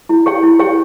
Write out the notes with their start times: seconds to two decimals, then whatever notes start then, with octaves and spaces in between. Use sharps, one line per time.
0.09 E4
0.26 G4 C#5 G5
0.43 E4
0.59 G4 C#5 G5